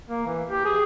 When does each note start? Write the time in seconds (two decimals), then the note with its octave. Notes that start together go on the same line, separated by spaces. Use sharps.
0.09 A#3
0.26 E3
0.49 G4
0.65 G#4